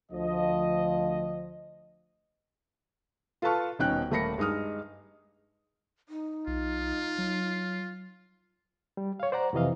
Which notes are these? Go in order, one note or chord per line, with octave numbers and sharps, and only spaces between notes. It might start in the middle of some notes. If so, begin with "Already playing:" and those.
D2 F3 D#5
F4 A4 B4 A5 C#6 F6
D#1 B2 C#4 D#4 G5 F#6
D#1 A3 A#3 B5 A#6 C#7
G2 G#3 D#4 D#6 F6
D#4
B1 F4
F#3
G3
C#5 F5
C5 D5 F#5 A#5
F2 C3 E3 D#5 F5